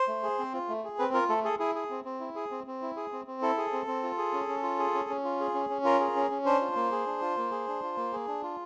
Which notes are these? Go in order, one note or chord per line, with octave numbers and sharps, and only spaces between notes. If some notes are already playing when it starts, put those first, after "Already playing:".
Already playing: C5
A3
G#4
C4
F4
A3
G#4
C4 B4
F4 A#4
A3 A4
G#4 A4
E4 G#4
G#4
C4
C4
E4
G#4
C4
C4
E4
G#4
C4
C4
E4 A4
G#4
C4
C4
F4
G#4
C#4
C#4
F4
G#4
C#4
C#4
F4
G#4
C#4
C#4
F4 A#4
G#4
C#4
C#4
D4 C5
F4
A#3
G#4
D4
F4
A#3
G#4
D4
F4
A#3
G#4
D4
F4